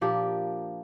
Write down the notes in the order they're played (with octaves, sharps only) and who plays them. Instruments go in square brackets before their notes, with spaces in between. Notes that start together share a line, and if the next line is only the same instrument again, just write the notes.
[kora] A#2 F3 A#3 D4 G4